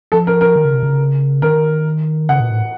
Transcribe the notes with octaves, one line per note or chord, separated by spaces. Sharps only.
F3 A4
A#4
A#4
D#3
C#3
C3
C#3
D#3 A#4
C#3 F#5
A#2
A2